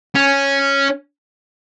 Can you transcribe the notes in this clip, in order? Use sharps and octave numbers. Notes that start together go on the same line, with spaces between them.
C#4